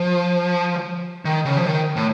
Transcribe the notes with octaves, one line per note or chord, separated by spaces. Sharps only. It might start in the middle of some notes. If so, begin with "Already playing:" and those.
Already playing: F3
D#3
C#3
F3
D#3
A2